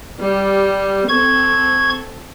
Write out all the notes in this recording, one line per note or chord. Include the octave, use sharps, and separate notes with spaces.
G3
C4 A4 C#6 G#6